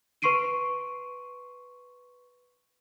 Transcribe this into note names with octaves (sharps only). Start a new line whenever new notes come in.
B4 C6 C#6 C7 D7 D#7